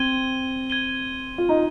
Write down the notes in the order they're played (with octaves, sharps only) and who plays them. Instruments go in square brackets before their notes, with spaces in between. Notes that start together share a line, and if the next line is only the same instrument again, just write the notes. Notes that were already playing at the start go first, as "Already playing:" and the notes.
Already playing: [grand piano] C4 [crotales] G#6 D#7 G7
[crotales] G#6 D#7 G7
[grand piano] F4
D#4